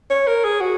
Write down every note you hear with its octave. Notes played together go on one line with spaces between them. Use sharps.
C#5
A#4
G#4
F#4